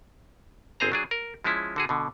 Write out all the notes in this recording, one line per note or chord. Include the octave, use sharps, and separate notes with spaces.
G1 C4 G#4 C5 A#5
F#3 D4 G#4
A#4
F3 G#3 C#4 E4
D3 F#4 G#4
B2 D3